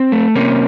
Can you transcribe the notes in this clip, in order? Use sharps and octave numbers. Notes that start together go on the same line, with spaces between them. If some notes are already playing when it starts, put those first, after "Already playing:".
Already playing: C4
A3
C3 A#3 C#4